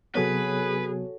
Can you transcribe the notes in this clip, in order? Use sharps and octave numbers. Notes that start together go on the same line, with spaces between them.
C3 F#3 B3 F#4 G#4 A4 B4 C#5